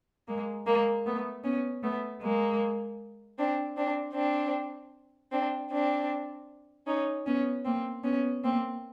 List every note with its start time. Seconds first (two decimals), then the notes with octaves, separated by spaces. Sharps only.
0.28 G#3 A#3
0.66 G#3 A#3
1.06 A3 B3
1.44 B3 C#4
1.83 A3 B3
2.22 G#3 A#3
3.39 C4 D4
3.77 C4 D4
4.16 C4 D4
5.32 C4 D4
5.72 C4 D4
6.87 C#4 D#4
7.26 B3 C#4
7.65 A#3 C4
8.04 B3 C#4
8.44 A#3 C4